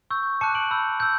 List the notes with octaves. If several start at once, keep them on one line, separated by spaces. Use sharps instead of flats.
C#6 E6 G6
A5 D6 F#6 C#7 E7
D7 F#7
B5 E6 G6
E6 G6